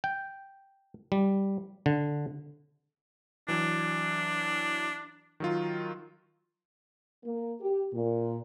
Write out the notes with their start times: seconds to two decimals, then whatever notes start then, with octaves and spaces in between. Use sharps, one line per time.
0.04 G5
1.12 G3
1.86 D3
3.48 E3 F#3 D4
5.40 D#3 F#3 F4
7.25 A#3
7.61 G4
7.94 A#2